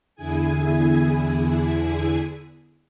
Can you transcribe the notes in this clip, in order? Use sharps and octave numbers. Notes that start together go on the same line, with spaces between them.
E2 D3 E4 G#4 G#5